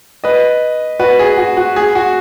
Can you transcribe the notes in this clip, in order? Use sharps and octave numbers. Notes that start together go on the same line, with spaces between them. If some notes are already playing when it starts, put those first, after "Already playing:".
B4 D#5
F#4 B4
G#4
F#4
F#4
G#4
F#4